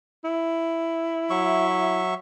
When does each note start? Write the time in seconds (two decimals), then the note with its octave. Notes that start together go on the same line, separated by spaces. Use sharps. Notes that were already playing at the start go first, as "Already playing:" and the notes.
0.25 E4
1.30 F#3 E5 C#6